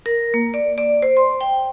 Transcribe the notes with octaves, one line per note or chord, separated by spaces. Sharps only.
A#4
A#3
D5
D5
C5
C6
G5